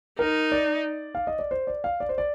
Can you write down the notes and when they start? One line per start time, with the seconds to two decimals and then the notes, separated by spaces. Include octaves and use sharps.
0.19 D#4 A#4
0.52 D5
1.15 F5
1.27 D#5
1.39 D5
1.51 C5
1.67 D5
1.84 F5
2.00 D5
2.09 C5
2.18 D5